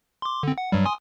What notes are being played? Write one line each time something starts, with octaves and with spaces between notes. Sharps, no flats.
C6 D6
D3 C4
F#5
G2 F#3 G3
G#5 C6 D#6